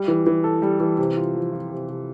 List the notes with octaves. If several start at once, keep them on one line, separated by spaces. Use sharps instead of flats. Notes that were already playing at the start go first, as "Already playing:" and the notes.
Already playing: G3
E3
E3
A4
G3
E3
C3
F4
F3
F4
C3
C3